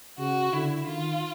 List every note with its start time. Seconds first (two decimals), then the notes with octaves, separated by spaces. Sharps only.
0.19 C#3 F#4
0.53 D3 E4
0.87 D#3 F4